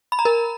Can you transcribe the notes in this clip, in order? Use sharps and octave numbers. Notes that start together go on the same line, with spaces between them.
B5
A#5
A#4